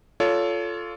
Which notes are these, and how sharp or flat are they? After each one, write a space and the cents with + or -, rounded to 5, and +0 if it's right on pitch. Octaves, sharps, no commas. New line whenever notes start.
F4 +0 A4 +0 C#5 +30